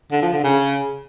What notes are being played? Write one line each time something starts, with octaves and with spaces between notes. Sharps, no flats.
D3
F3
D3
C#3